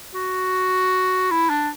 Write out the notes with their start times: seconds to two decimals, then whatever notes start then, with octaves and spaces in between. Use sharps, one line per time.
0.15 F#4
1.31 E4
1.50 D4